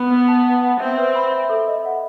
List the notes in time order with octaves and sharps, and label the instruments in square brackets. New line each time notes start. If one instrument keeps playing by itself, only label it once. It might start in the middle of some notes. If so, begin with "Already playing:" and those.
Already playing: [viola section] B3
[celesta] B4
A5
F#5
F#5
[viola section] C4 [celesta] E5
[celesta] B4
B5
E5
A4
D#5
F#5